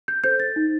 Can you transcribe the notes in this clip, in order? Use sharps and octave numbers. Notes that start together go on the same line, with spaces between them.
G6
A4 C5 G6
A6
D#4